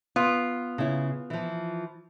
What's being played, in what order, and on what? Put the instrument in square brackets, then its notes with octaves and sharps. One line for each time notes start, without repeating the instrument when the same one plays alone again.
[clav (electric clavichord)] B3 [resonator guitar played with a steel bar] F4
[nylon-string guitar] C#3 E4
E3 F3